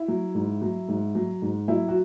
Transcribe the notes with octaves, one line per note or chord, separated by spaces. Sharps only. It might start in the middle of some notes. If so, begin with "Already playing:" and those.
Already playing: E4
F#3
G#2
F#3
G#2
F#3
G#2
F#3 E4
F#4